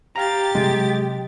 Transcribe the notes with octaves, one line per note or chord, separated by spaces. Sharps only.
G4 F5 A#5 A6
C3 F#3 G#3